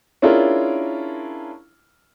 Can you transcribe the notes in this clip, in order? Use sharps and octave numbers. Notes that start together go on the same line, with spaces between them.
C#4 D4 E4 F4 G#4 A#4